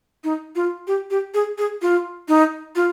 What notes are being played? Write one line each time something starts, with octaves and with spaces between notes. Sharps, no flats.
D#4
F4
G4
G4
G#4
G#4
F4
D#4
F4